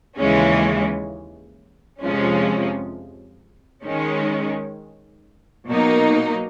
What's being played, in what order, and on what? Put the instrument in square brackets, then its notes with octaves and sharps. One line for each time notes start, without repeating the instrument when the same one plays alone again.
[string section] D#2 C#3 E3 G#3 C#4
F2 C3 F3 G#3 C#4
D#3 G#3 C#4
B2 F#3 A#3 D#4